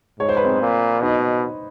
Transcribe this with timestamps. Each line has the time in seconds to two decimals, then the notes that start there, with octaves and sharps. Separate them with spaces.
0.20 G#2 C#5
0.29 C5
0.37 B4
0.44 C4 C5
0.62 A#2
1.02 B2 D#4 D#5